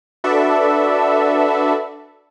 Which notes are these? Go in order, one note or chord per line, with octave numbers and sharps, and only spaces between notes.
D4 F#4 A4 B4 D5 E5